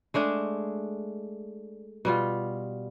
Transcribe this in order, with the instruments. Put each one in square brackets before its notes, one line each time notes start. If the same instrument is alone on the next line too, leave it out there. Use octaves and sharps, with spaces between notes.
[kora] G#3 A3 D4 G#4
B2 G3 F4